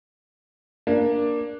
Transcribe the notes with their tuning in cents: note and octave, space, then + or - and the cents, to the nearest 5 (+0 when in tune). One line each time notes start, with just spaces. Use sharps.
A#3 +10 D4 +0